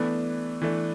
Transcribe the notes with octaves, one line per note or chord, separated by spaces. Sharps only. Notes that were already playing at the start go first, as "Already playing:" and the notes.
Already playing: E3 A3 B3 D4
E3 A3 D4